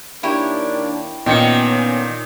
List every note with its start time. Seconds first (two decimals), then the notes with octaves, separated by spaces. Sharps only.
0.23 D#3 A#3 D4 E4 G4 C#5
1.26 A#2 D#3 B3 C#4 C#7